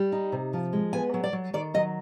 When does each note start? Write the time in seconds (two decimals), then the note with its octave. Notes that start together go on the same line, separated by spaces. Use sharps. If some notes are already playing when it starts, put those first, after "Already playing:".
Already playing: G3
0.12 D#4
0.32 C3
0.53 F3
0.73 G#3
0.93 B3 G#5
1.14 F#3
1.24 D5
1.33 F#3
1.54 D#3 D5
1.74 F#3 D#5